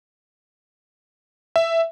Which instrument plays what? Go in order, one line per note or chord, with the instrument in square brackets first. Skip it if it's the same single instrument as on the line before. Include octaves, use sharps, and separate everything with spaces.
[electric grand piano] E5